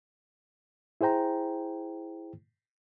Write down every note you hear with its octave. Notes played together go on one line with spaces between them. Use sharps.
E4 G#4 C5 G5 A#5